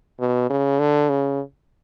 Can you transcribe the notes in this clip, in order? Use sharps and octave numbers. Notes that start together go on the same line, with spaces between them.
B2
C#3
D3
C#3